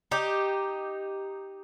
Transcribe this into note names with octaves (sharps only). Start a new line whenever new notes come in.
D#4 G4